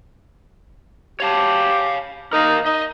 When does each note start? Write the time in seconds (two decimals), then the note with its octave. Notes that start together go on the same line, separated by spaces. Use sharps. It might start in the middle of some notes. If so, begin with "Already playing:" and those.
1.20 G4 C#5 F5 A5
2.33 D#4 A#4 D#5 F5
2.66 D#4 D#5